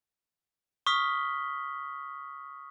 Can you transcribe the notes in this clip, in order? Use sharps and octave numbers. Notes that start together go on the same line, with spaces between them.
C#6 D#6 F6 B6 G7